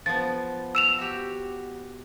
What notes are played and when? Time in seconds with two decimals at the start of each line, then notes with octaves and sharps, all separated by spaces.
0.06 F3 B3 A6
0.75 E6 E7 F7
0.98 F#4 G4